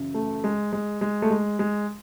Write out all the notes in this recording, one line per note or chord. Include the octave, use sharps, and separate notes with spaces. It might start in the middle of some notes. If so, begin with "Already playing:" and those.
Already playing: F#2 C#3 E3
A3
G#3
G#3
G#3
A3
G#3
G#3